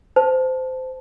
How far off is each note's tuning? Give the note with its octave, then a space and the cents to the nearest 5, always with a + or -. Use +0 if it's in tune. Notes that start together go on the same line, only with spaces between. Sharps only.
C5 -20 A5 +0